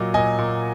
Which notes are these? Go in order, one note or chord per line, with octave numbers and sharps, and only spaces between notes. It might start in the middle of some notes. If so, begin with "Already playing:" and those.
Already playing: A#2 F#3 D#5
A#2 D#5 G#5
A#2